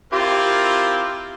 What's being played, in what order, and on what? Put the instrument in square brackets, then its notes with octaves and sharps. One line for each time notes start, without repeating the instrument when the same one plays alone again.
[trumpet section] C4 E4 A#4 [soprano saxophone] F4 [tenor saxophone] G4